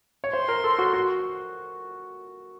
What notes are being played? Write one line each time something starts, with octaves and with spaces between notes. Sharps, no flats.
C#5
C5 C6
A#4
A4
F#4
F#4